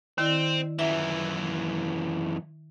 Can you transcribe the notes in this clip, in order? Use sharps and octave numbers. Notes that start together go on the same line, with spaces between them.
D#3 C4 E4 D5
F#2 E3 E5